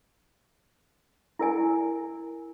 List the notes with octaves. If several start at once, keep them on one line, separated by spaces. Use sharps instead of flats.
E4 A#4 G#5